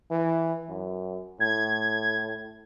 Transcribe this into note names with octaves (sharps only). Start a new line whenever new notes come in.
E3
F#2
A2 G#6